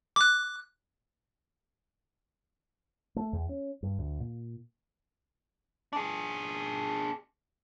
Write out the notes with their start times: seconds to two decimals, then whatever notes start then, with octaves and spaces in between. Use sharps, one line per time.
0.16 D6 F#6
3.16 A3
3.33 E2
3.49 C#4
3.83 G2
3.99 D2
4.20 A#2
5.93 D4 G#4